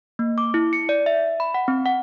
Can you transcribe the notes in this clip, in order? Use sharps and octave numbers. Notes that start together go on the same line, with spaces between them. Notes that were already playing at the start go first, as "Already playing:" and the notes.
A#3
D6
E4
C#7
D5
E5
B5
F#5
C4
F#5